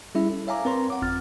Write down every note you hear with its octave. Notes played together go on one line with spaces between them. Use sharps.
G3 C#4 E4 G#4 E5
A4
C#5 E5 F5 G#5 A#5 D6
C4 A#4 B4 C#5 A#5 C6
F#5 D6
G1 F2 C4 F6 A6